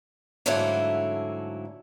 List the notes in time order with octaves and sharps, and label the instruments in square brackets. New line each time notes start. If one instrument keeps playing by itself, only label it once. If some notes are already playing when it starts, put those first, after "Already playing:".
[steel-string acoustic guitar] G#2 D3 F#3 A3 A#3 E4